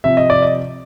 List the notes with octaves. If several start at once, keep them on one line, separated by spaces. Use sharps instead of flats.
C3 F3 E5
D#5
D5
D#5